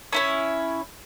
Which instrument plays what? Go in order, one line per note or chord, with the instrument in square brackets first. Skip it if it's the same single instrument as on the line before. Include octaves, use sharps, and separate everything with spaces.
[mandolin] C#4 E4 C#5